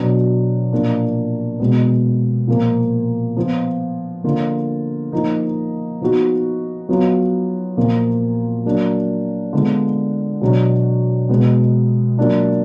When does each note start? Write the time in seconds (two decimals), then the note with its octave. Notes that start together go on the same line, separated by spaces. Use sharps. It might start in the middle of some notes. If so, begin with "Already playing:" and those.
Already playing: B2 F#3 B3 D4
0.72 A#2 F3 A#3 D4 F4
1.60 B2 G#3 B3
2.48 A#2 F3 A#3
3.37 F3 B3 F4
4.24 D3 F3 A#3 F4
5.12 F3 A#3 D#4
6.01 F3 B3 D#4 F#4
6.89 F#3 B3 F4
7.77 A#2 F3 A#3 F4
8.66 F#3 A#3 D4
9.53 D3 G#3 B3 D4 F4
10.41 B2 F#3 D4 F#4
11.29 B2 G#3 B3
12.18 F#3 A#3 D4 F4